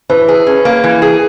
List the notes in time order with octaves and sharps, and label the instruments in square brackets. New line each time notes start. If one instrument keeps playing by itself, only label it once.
[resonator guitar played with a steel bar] E3 [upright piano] B4
[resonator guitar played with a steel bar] G#4
C#4
A#3
E3
G#4